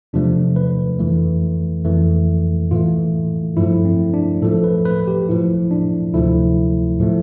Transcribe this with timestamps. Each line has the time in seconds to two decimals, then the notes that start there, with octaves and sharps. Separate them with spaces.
0.13 E2 C3 F3 A3 D4
0.56 B4
0.99 F2 E3 A3
1.84 F2 E3 A3
2.71 A2 E3 A3 F4
3.57 G2 F3 A3 E4
3.85 C4
4.14 D4
4.42 A2 F3 A3 A4
4.64 B4
4.85 B4
5.08 G4
5.29 A2 F3 A3 E4
5.71 D4
6.14 D2 C3 F3 A3 E4
7.00 A2 F3 A3